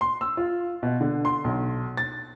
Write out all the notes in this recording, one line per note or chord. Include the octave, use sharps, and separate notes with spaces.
C6
E6
F4
B2
D3
C6
B1
A6